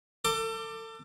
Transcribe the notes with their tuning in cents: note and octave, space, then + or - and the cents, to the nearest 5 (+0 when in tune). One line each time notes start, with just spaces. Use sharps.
A4 +35 D6 +15